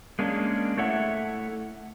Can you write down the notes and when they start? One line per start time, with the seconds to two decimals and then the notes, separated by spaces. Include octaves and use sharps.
0.19 G#3 A#3 C#4 D4
0.77 A3 E4 A4 C#5 E5 F#5